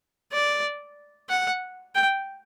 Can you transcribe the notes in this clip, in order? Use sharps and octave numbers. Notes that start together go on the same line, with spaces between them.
D5
F#5
G5